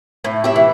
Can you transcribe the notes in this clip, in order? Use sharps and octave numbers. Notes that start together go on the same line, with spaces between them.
A2
E4 G4
E3